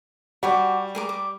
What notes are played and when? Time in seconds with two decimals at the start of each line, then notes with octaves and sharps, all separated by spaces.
0.43 G3 F#4 G#5 D6
0.95 G#4 A#4 D6
1.09 D6